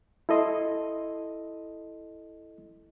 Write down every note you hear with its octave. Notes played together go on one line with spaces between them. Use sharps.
E4 A4 D#5 C6